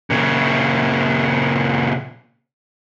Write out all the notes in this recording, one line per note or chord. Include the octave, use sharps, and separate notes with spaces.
A#2 C#3